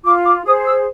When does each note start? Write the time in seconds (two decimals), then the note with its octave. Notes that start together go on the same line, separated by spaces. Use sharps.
0.04 F4 D6
0.25 D6
0.44 G#4 C5 D#6
0.65 E6